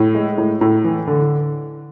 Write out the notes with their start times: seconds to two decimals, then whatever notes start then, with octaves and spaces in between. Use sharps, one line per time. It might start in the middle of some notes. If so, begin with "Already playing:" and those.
Already playing: A2
0.15 G#3
0.38 A2
0.61 A2
0.84 E3
1.07 D3